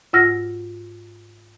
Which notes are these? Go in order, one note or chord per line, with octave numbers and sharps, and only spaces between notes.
G#2 F4 F#5 E6 F6 A#6